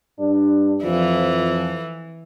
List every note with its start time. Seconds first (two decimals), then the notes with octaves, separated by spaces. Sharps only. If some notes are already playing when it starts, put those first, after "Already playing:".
0.20 G2 D4
0.84 F2 E3 F3